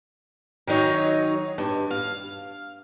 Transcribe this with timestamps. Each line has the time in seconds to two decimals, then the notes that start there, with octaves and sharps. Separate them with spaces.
0.67 D#3 F#3 D#4 C#5 D#5
1.58 G2
1.91 F5